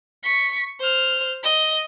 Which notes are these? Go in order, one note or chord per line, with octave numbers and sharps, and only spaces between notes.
C#6 B6
C5 F6
D#5